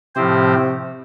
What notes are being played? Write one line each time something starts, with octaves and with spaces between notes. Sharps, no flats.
A2 C3 F3 C4 G4 C5